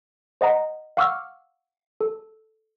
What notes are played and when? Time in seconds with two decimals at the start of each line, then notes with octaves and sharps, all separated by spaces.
0.41 C5 D#5 F#5 A#5
0.97 F5 F#5 C#6 D6 E6 F6
2.01 A4